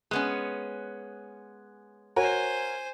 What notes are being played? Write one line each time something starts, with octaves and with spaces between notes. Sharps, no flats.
G#3 B3 C#4 F#6
F#4 A#4 C5 C#5 G#5